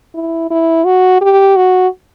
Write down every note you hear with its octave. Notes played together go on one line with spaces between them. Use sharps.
E4
E4
F#4
G4
F#4